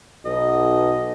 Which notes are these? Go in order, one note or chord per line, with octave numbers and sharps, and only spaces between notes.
B1 D#5